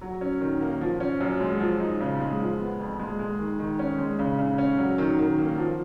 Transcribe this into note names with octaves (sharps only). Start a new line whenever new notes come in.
F#3
C#4
D#3
A#3
F3
C#4
F#2
G#3
F3
D#4
C#3
G#3
F3
B3
F2
G#3
G#3
D#3
D#3
C#4
G#3
C#3
C#3
C#4
F#3
D#3
D#3
A#3
F3